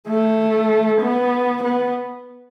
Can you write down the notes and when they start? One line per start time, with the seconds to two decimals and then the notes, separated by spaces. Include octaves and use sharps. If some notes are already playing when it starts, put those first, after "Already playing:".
0.08 A3
1.01 B3
1.63 B3